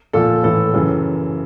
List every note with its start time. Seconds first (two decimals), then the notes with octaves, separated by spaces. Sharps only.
0.13 A#2 F3 A4
0.43 A2 E3 A4
0.74 F#2 C#3 E3